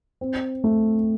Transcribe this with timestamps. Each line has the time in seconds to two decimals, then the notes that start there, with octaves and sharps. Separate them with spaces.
0.21 C4
0.64 A3